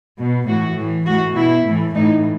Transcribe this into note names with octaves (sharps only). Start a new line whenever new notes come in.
B2
A2 E3 F#4
A2 E3
A2 E3 F#4
B2 E4
A2 E3
A2 E3 D#4